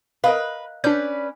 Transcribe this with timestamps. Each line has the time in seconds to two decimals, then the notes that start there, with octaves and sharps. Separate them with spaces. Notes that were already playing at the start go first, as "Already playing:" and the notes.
0.24 A#4 B4 D#5 F5
0.84 C#4 D4 B4 D5 G6